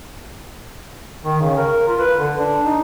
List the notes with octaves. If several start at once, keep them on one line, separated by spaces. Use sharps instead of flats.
D#3
C#3
A#4
F4
B4
D3
D4
D#4